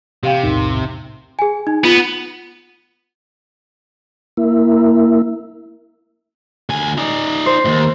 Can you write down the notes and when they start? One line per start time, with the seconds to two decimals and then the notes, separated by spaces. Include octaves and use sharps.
0.23 C3 G4 F5 G5
0.43 B1 E2 A2 D#3
1.39 G#4 G#5
1.67 D#4
1.84 B3 F4
4.37 A#3 E4
6.70 D2 G#5
6.98 D#4 D5
7.46 C5
7.65 D#2 A2